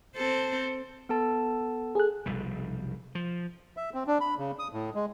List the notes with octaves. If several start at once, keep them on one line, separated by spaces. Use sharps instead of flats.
C4 A4 C5
B3 A4 A5
G#4 A4 F#6
F1 B1 G3
F3
E5
C4
D4
B5
C#3
D#6
A2
G#3